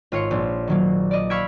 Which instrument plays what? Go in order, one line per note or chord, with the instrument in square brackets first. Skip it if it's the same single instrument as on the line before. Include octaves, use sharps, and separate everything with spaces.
[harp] G#1 F4 C#5 F5 C#7
A#1
D#3 F#3 A#3
D5 D#5
F5 B5 C#6 E6 G#6 D7